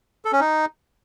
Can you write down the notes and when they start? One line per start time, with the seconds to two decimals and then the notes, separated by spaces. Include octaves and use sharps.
0.25 A4
0.33 C#4
0.40 D#4